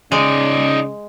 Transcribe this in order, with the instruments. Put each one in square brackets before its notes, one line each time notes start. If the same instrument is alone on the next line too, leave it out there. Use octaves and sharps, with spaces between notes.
[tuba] C#3 [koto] G#3 G#5 [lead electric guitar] D#4 D5